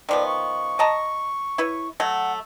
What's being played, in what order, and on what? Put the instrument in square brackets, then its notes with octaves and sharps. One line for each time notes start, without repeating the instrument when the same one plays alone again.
[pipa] D#3 F3 B3 [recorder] D5
[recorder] C#6
[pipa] D#5 A5 A#5
E4 B4 C#5
[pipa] F#3 A3 [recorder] F#5